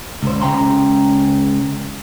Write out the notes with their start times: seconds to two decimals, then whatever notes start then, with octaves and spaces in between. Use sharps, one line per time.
0.23 C#2 C5
0.42 C#2 F#2 C#3 G5 A#5 C6